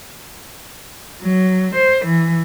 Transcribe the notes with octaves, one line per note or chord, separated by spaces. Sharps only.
F#3
C5
E3